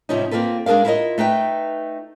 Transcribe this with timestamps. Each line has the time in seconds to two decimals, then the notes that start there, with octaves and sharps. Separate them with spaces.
0.09 G#2 C3 F3 C#4 D#4
0.31 A#3 C4 F4 A4 B4
0.66 G#3 D4 G#4 A#4 F5
0.85 E4 F4 A#4 D5 D#5
1.18 A3 D#4 B4 G5